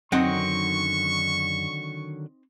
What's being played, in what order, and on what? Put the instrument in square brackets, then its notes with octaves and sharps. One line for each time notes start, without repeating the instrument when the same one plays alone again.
[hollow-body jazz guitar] F#2 [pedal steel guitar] D3 D#3 F#3 [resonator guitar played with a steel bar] C4 D#4 F#5 [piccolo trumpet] C#6